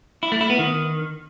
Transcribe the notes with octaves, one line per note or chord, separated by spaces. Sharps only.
E4
A3
E4
B3
D#3